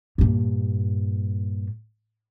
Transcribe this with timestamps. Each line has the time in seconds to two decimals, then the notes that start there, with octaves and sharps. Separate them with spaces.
0.18 G2 A#2